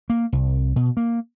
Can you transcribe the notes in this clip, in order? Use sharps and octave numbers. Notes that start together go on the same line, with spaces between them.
A#3
C2
B2
A#3